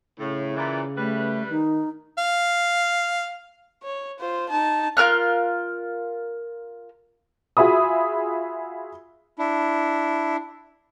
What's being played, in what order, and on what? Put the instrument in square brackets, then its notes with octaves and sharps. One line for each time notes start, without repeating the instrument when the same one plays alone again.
[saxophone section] A2 [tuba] C#3
[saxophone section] A#2 E3
[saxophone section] G3 B4 [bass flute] A3
[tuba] D#3 [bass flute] D#4
[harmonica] F5
[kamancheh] C#5
F4 C5
D#4 A5
[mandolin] F4 A#4 F6 F#6
[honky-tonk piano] F4 F#4 G#4 E5 B5 D#6
[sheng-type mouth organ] D4 E4